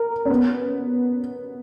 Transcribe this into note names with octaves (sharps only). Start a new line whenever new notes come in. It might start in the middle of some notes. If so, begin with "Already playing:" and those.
Already playing: A#4
C#4
B3